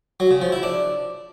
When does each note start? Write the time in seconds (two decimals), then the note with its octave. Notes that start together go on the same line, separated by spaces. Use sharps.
0.20 F#3
0.31 C#3
0.42 F3
0.52 E4
0.63 D4